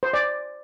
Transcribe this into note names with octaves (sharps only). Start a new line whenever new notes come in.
C5
D5